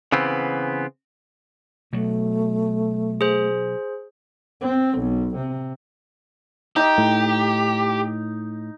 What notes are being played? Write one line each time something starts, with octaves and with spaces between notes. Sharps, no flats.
C#3 E3 B3 C4
B2 F#3 A3
G#4 C5
C4
B1
C3
D#4 G4
A2